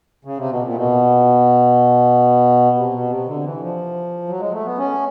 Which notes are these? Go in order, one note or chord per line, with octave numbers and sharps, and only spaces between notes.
C#3
C3
B2
A#2
B2
C3
B2
C3
D3
E3
F3
F#3
G#3
A3
B3
C#4